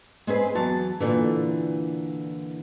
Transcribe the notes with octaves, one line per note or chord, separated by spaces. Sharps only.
G#3 C4 G#4 B4 C5
E2 F#3 A5
A#2 D3 E3